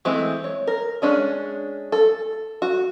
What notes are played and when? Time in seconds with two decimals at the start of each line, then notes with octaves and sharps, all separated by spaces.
0.05 E3 G#3 A3 C4
0.44 C#5
0.67 A#4
1.02 G#3 C#4 D4 G#4
1.92 A4
2.62 F#4